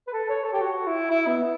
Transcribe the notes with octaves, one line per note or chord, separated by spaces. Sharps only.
B4
A4
C#5
A4
G4
F#4
E4
E4
B3